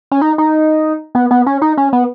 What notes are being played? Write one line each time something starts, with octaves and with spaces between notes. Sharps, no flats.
C#4
D#4
D#4
B3
B3
C#4
D#4
C#4
B3